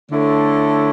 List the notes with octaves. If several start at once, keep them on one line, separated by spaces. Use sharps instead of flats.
D3 A3 E4 A4 C#5